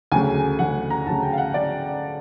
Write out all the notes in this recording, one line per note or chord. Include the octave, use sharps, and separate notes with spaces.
D2 C#3 F#3 G#5
D2 C#3 F#3 F#5
A#5
D2 C#3 F#3 A5
G5
F5
F#5
C#3 F#3 D5